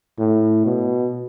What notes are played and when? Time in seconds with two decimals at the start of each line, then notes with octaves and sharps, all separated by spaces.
0.18 A2
0.66 B2